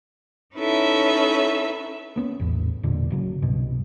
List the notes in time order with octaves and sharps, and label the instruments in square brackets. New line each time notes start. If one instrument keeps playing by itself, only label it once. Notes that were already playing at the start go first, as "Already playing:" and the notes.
[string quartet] C#4 D#4 E4 A4 B4 E5
[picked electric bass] A#3 B3 C#4
A#1 E2 A2
E1 A#2 D3
G1 C#3 F#3
C2 G2 B2